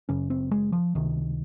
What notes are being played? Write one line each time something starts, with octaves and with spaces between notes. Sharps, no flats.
F#1 F#2 C#3 C#4
C4
G#3
F3
C#2 C3 D#3